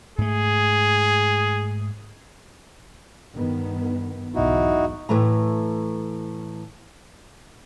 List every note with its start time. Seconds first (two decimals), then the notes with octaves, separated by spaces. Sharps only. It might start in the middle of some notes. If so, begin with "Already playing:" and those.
0.18 G#2 A3 G#4
3.33 G2 D#3 B3
4.35 B1 E2 G#2 D#4 E4 F#4
5.09 A2 E3 A3 A#5